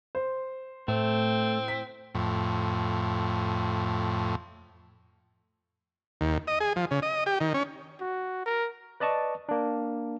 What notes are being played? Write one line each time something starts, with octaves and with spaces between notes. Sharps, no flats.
C5
A2 A3 C4
B6
F2 A2
D#2
D#5
G#4
F3
C#3
D#5
G4
D#3
C#4
F#4
A#4
B4 D5 D#5 A5 C#6
A#3 D4